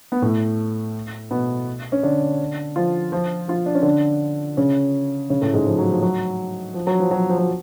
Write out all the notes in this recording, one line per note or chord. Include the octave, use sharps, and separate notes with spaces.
B3
A2 A3
B2 B3
C#4
D3 D4
F3 F4
F3 F4
F3 F4
D4
C#4
D3 D4
C#3 C#4
C#3 C#4
A2 A3
G#2 G#3
F3
F#3
F3
F#3
F3
F#3
F3
F#3
F3
F#3